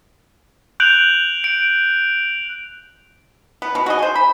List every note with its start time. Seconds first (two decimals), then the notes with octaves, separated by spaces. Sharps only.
0.80 F#6 G6 D7 F7 F#7
1.44 D7
3.62 B3
3.75 B2
3.86 F#4 G#4 D#5
3.99 G#4 C5
4.16 B5